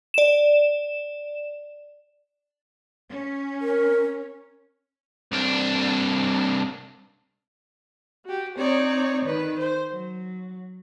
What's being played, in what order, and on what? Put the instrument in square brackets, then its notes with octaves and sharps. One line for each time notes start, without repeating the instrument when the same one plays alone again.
[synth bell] D5 E7
[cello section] C#4
[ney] A#4
[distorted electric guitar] C2 D4
[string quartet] F#4 G4
C4 D#4 C#5 D5
D#3 B4
C5
F#3